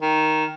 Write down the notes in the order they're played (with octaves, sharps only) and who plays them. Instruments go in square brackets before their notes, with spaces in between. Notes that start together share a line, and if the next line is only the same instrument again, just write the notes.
[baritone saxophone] D#3